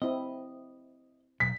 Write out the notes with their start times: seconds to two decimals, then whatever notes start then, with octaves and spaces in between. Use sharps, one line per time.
0.02 C4 E4 D#5
1.40 B1 B6